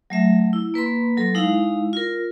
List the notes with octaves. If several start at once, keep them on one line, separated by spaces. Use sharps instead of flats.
F#3 A3 E5
E4
A#3 B4 B5 C6
F#3 A4
G#3 D#4 E4 F5
F4 A#4